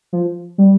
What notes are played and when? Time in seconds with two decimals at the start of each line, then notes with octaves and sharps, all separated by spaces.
0.13 F3
0.58 G3